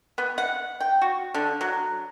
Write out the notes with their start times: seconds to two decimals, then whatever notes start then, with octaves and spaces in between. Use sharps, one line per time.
0.18 B3
0.38 F#5
0.80 G5
1.01 F#4
1.34 D3
1.61 F#3